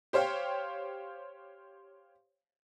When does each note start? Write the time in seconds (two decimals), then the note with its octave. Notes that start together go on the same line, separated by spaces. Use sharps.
0.13 G4 C5 C#5 F5 G5